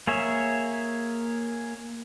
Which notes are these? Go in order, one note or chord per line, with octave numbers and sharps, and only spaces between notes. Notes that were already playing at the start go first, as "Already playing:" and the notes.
A#3 G#4 C#5 E5